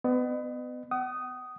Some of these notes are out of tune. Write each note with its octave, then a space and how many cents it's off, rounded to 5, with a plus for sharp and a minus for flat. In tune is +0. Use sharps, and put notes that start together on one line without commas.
B3 +30 D#5 -40
F#5 +40 D#6 +0